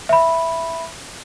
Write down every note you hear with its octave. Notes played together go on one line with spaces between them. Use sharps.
E5 B5